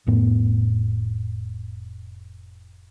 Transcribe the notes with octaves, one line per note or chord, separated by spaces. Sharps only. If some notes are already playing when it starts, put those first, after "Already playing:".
F1 F2 A2 B3